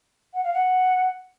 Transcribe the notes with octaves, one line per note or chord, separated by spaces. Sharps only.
F#5
F5
F#5